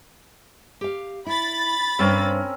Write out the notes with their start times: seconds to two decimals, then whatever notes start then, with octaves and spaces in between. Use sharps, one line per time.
0.81 G4 F5
1.26 E4 B5 A6
1.99 G2 C4 C#4 A#4 C5